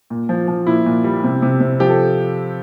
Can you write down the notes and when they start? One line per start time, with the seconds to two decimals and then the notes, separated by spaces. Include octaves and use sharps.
0.10 A#2
0.29 F3
0.48 F3
0.67 A#2 E4
0.86 A#2
1.04 G3
1.24 C3
1.42 C3
1.60 C3
1.80 F3 G4
1.89 A4